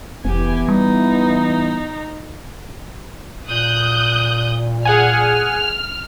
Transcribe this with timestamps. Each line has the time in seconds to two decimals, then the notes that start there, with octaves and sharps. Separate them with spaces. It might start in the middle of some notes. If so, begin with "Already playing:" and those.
0.25 F1 E3 B3 G4 G#5
0.68 G3 D#4
3.48 A#2 D#6 F#6 G6
4.85 G#4 F#5 G#5 F6